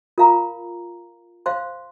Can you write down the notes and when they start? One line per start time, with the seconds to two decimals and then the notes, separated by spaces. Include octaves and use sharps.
0.18 F4 A#4 F5 A#5
1.46 C5 F5 C6